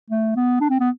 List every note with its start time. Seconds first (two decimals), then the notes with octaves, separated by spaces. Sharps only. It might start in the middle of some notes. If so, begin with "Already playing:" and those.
0.10 A3
0.36 B3
0.61 D4
0.70 C4
0.80 B3